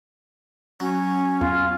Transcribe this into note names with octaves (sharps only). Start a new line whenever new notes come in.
F#3 C#4
E2 F4